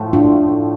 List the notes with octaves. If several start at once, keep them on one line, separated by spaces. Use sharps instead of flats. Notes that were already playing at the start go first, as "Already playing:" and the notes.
Already playing: A2 F3 A3
D4 F4